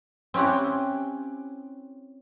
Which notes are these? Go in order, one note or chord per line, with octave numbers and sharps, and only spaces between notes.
C4 C#4 E4 G4 F#5